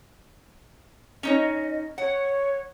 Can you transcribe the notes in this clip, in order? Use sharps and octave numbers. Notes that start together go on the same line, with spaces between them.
C#4 D#4 C#5 D#5
C#5 F#5